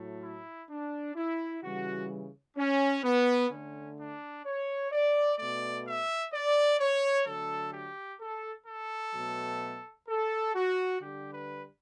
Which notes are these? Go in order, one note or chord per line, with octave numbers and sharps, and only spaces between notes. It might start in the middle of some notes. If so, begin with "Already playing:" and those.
Already playing: A2 F#3 A3
E4
D4
E4
C#3 E3 G3 F#4
C#4
B3
D3 A3 C#4
D4
C#5
D5
B2 A3 D5
E5
D5
C#5
D3 F#3 A3 A4
G4
A4
A4
B2 F#3 A3
A4
F#4
D3 G3 G4
B4